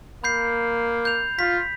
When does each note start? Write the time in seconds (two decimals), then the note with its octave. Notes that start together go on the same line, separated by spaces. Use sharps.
0.24 A#3 B5 G6 C7
1.05 G6 F7
1.39 F4 B6